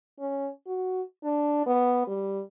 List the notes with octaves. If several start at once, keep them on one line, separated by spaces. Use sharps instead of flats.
C#4
F#4
D4
B3
G3